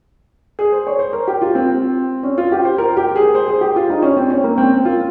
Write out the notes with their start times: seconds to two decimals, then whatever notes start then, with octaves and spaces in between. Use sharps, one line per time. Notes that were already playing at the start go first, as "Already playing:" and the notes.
0.59 G#4
0.72 C5
0.87 C#5
0.99 C5
1.13 A#4
1.28 G4
1.42 F4
1.55 C4
2.23 C#4
2.38 F4
2.52 G4
2.65 C5
2.78 A#4
2.97 G4
3.16 G#4
3.35 C5
3.48 G#4
3.61 G4
3.76 F4
3.90 D#4
4.02 C#4
4.17 C4
4.30 C#4
4.44 A#3
4.58 C4
4.85 F4